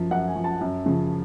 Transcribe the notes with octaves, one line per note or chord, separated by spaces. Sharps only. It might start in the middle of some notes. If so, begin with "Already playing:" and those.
Already playing: F#2 F3
F#2 F#5
G#5
F3
A5
F#2
C#3 F3